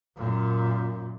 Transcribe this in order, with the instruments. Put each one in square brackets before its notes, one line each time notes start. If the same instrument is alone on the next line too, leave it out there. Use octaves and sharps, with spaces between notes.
[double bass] F#2 A#2